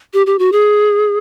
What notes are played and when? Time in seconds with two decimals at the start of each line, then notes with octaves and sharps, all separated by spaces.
0.14 G4
0.26 G4
0.39 F#4
0.52 G#4